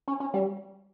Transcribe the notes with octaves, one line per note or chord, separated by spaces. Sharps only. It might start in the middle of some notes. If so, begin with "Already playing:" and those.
C#4
C#4
G3